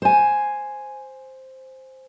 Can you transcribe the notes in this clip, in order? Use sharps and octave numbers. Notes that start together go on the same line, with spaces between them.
C5 G#5